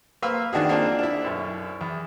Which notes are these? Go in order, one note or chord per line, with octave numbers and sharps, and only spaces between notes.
A#3 B4 C5 F5 E6
D#3 D4 F#4 G#4
A#3 C4 D4 F4
D4 E4
B1 F#2
E2